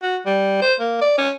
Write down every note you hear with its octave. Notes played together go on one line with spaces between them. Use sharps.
F#4
G3
C5
A#3
D5
C#4